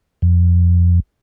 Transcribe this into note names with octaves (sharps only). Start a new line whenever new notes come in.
F2